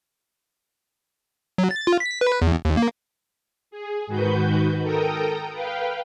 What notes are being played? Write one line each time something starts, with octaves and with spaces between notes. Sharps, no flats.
F#3
A6
F4
B6
B4
E2
D#2
A#3
G#4
G#2 D#3 F#4 B4 G6
A4 A#4 G5 A#5 D#6
B4 F5 G5